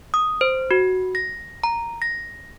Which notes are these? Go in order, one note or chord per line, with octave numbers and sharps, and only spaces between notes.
D#6
C5
F#4
A#6
A#5
A#6